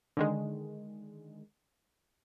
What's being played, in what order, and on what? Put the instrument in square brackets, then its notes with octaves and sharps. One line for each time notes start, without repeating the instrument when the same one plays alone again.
[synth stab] D3 D#3 G#3